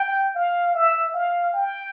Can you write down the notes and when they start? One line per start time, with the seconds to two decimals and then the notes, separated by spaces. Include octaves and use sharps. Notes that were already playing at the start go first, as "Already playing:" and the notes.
Already playing: G5
0.35 F5
0.75 E5
1.14 F5
1.54 G5